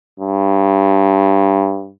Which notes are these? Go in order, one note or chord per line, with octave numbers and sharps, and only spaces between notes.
G2